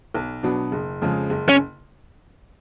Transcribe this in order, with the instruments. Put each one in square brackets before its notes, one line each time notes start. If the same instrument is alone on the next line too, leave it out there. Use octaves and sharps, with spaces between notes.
[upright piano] B1
B2 F#3 B3 D4
F#1
F2 C#3 F3 G#3
F#1
[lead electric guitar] C#4